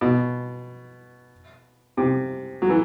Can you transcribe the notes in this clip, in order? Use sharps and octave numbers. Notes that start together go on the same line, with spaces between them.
B2
C3
F#3
E3